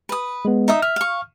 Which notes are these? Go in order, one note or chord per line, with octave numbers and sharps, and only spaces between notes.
B4 D#6
G#3 B3
D#4 E5 D#6
E5 F6
F5 C#6